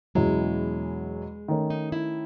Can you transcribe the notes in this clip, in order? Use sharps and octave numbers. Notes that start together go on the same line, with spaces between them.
E2 B2 F#3 G#3 C#4 E4
D#3 A3 C#4
D#4
E4